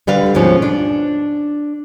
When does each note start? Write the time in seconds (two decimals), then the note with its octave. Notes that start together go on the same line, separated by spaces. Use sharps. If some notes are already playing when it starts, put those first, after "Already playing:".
0.07 D3 G3 B4 F5
0.34 D#2 G#2 B2 F3 C#4
0.62 D4